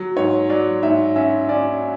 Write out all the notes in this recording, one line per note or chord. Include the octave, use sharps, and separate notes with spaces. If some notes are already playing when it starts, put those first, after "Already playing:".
Already playing: F#3
G#2 C#5
F#3 D5
G#2 E5
C#4 E5
C#4 D5